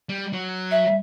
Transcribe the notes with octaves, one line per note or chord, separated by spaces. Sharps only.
G3
F#3
E5